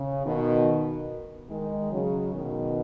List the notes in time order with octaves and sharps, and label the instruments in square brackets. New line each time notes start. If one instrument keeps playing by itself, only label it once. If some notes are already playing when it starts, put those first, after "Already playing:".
Already playing: [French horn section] C#3
B2 D#3
D#3 G#3
C#3 F#3
B2 D#3